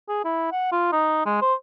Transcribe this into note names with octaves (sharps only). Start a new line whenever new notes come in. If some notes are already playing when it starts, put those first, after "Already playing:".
G#4
E4
F#5
F4
D#4
G#3
C5